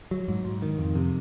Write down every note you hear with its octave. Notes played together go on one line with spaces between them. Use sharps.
F#3
G#2
G#2
D#3
F2
C3